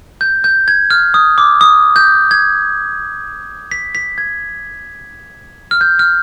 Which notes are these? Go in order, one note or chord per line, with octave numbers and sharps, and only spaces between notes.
G6
G6
G#6
F6
D#6
D6
D#6
G6
G#6
B6
B6
G#6
F6
G6
F6